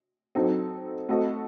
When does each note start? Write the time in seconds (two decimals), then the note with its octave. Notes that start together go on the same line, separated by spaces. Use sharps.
0.35 F#3 C4 D#4 A4
1.09 A3 C4 F#4 A4 D#5